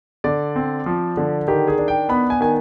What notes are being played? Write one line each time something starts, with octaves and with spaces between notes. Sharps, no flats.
D3 D5
C4
F3
D3
D#3 G4
G#4
D4
G5
B3 B5
G#5
D#3 G#5